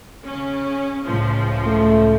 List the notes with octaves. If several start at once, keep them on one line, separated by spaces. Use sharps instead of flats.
C#3 C#4
C#2 A2 F3
A3